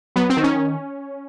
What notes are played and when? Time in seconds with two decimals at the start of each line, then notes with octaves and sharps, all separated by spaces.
0.16 F#3 B3
0.30 C4
0.37 D#3
0.44 C#4